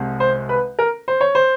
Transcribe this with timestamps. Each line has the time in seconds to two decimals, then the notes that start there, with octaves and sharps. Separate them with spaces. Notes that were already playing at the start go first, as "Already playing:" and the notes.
Already playing: C2 C3 G#3
0.20 C5
0.49 B4
0.79 A#4
1.08 C5
1.21 C#5
1.35 C5